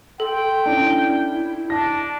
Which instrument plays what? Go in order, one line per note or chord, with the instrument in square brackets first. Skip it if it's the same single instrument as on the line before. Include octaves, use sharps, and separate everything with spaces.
[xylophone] A4 [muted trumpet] G5 [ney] C6
[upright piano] C#4 D4 [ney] E4
[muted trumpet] D4 [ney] A5 [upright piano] A#6